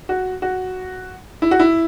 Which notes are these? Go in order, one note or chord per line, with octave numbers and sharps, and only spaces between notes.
F#4
F#4
E4
F#4
E4